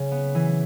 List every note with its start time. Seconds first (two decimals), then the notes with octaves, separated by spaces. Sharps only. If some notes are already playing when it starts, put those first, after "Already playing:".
Already playing: C#3
0.11 B3
0.35 E3